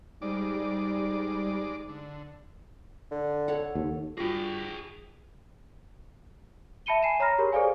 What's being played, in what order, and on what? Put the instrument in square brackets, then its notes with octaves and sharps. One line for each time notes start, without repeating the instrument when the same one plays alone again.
[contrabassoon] G#2 [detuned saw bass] G3 [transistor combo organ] G#3 D5 D6
[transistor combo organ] D3
[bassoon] D3
[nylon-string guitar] A4 C#5 F#5
[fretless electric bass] D#2
[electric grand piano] G2 C#6 A#6 [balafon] F4 F#4 [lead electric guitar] G#4 G5
[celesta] E5 A5 B5 C#7 D#7 G7
G#5 C7 D#7 E7
C#5 A#5 B5 F6 A#6
G4 G#4 A#4 C#5
G#4 A4 C5 D5 F5 G#5